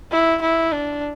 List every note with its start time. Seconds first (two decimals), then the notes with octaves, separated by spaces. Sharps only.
0.12 E4
0.41 E4
0.72 D4